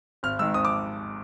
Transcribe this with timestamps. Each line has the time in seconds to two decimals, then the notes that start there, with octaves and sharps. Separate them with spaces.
0.23 G#1 F6
0.39 G#2 D#3 E6
0.54 G#1 D#6
0.65 D6